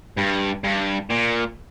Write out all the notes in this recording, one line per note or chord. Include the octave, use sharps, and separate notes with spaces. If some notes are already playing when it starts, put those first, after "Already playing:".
G2
G2
A#2